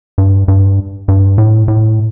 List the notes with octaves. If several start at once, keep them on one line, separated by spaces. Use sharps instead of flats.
G2
G2
G2
A2
A2